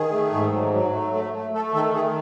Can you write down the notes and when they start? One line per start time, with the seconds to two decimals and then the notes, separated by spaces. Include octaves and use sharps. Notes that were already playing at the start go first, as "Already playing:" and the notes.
Already playing: D#3 G#4
0.12 A3
0.32 G#2
0.52 F#3
0.73 F#3
0.93 A3
1.13 A3
1.33 A3
1.53 A3 A4
1.74 D#3 A4
1.94 D#3 G#4